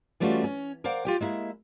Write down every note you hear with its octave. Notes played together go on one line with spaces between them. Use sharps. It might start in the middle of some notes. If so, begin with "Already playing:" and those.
E3 G3 A3 C#4 F4 F#4
C#4
A#4 C5 D5 F5 F#5
F4 G4 G5
G#3 A#3 E4